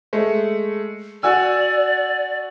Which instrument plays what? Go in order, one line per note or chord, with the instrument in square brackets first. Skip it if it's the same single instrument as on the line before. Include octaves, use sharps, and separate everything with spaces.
[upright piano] G#3 A3
[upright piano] F#4 G#5 E6 [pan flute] D5